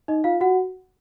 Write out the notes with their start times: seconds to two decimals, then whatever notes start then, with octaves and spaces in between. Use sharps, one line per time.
0.08 D#4 D#5
0.24 F4 F5
0.41 F#4 F#5